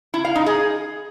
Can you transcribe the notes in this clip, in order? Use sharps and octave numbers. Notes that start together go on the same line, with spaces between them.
E4
F5
D#4
G#4